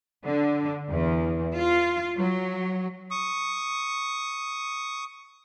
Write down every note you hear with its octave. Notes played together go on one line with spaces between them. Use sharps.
D3
E2
F4
F#3
C#6 D#6